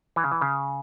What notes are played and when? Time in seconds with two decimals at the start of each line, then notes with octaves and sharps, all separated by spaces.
0.16 E3
0.24 C#3
0.31 E3
0.41 C#3